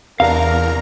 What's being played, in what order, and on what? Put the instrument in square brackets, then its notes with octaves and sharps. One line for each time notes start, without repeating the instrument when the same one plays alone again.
[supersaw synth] E2 A#5 [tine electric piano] C3 D4 [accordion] A#4 [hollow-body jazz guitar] F5